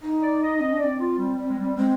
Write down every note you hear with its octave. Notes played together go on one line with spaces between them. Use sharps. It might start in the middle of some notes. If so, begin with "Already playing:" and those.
D#4
D5
D#5
C4 D#5
D4
C4 D5
F4
G3
G3
G#3
G3
G#3 C4